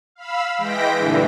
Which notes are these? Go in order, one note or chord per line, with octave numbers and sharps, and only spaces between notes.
F5 B5 E6
E3 G#3 G5 A#6 B6 D7
G2 A#2 D3 E3